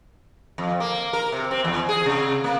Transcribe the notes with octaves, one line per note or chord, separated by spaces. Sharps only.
F2
A#3
A#4
C3
C4
E2
G#4
C3
A#3